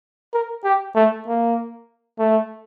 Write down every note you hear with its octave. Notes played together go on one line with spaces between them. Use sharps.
A#4
G4
A3
A#3
A3